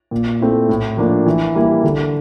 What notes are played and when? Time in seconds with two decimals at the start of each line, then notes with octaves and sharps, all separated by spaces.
0.11 A#2
0.40 A3 C4 E4
0.69 A2
0.97 F3 A#3 D4
1.26 E3
1.55 G3 A#3 E4
1.83 D3